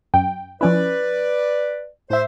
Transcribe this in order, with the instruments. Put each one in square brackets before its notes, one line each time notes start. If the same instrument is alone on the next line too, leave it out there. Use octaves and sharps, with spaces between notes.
[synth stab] F#2 G5
[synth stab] F3 C#4 E4 [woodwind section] B4 D5
[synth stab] A2 E5 [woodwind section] C5